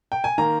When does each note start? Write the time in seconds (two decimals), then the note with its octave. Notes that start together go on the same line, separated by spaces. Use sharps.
0.12 G5
0.24 G#5
0.38 D#3 A#3 A#5